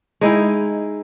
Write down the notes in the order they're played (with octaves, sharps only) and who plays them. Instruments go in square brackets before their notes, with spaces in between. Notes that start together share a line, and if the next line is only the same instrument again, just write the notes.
[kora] G#3 D#4 E4 G5